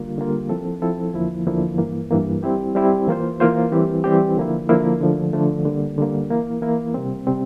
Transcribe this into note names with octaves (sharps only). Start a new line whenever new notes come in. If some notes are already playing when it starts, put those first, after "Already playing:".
Already playing: D3 G3 A#3 F4
D3 G3 A#3 F4
F3 C4 E4 A4
F3 C4 E4 A4
E2 D3 F3 A#3 E4
E2 D3 F3 A#3 E4
G2 E3 A#3
G2 E3 A#3
G3 C4 E4 G4
G3 C4 E4 G4
E3 A#3 F4 C5
E3 A#3 F4 C5
E3 G3 C4 G4
E3 G3 C4 G4
D3 F3 A#3 E4
D3 F3 A#3 E4
D3 F3 A3
D3 F3 A3
D3 G3 A#3
D3 G3 A#3
E3 A#3 E4
E3 A#3 E4
C3 G3 C4
C3 G3 C4